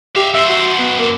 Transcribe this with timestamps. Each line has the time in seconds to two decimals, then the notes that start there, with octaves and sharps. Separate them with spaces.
0.16 G4 E5 F5
0.34 F#2 C5 E5
0.49 F#4
0.79 B3
0.99 A#3